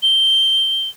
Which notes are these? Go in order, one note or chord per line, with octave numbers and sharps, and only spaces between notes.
G7